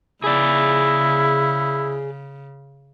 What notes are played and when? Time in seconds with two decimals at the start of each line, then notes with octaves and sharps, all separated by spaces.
0.24 C#3 E4 G#4 D5